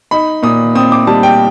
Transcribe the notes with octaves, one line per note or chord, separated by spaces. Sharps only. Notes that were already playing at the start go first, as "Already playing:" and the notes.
D#4 B5
A#2 D#6
C4 D#6
D6
G3 A5
G5